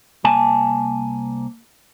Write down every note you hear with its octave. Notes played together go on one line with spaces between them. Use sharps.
C2 A#3 G#5 A5